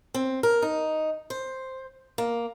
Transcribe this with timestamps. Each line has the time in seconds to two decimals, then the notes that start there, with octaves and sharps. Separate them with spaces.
0.14 C4
0.43 A#4
0.62 D#4
1.30 C5
2.18 A#3